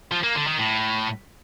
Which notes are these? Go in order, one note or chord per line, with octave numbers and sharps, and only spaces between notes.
F3
A#3
D3
D#3
A2